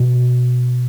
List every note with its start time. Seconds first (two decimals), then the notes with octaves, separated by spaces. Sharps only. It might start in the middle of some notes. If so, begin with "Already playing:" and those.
Already playing: B2